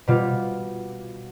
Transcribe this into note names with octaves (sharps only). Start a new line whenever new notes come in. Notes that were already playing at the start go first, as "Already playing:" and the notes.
B2 G3 F4